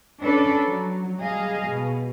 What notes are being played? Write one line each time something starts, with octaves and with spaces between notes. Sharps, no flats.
C#4 D4 A4 B4 D5
F#3
G3 G#4 D#5 F5
B2